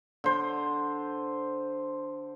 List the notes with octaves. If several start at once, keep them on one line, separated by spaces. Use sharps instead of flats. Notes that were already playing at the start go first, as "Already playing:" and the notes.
D3 C5